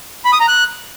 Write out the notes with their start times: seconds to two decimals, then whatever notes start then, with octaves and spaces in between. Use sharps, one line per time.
0.25 B5
0.32 D#6
0.40 A#5
0.48 F#6